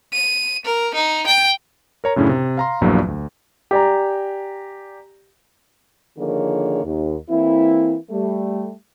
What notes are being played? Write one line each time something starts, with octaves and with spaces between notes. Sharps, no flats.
D#7
A#4
D#4
G5
A#4 C#5 A#5
F#2 A2 C#3 C#4 D4 E4
C3
F5 A#5 C6
A#1 E2 G2 F3 F#3 A#3
D2
G4 D5 G#5 A#5
D3 D#3 F3 A#3 G#4 C#5
D#2
E3 A#3 C4 E4
G3 A3